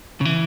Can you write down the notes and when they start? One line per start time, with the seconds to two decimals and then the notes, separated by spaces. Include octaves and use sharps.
0.21 C#3
0.25 E3